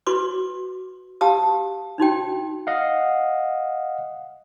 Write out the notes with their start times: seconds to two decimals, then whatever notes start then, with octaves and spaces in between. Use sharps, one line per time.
0.07 F#4 B4 C6 D6
1.21 G4 F5 A5 D#6
1.98 D4 D#4 F#4 G5
2.67 D#5 F5 F#5